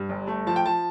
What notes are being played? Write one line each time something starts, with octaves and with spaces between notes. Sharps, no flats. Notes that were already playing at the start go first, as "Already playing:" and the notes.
Already playing: G2
G1
A3
F3 A5
G5
F3 A5